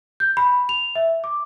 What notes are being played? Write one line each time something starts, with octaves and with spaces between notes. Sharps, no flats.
G6
B5
F7
E5
D6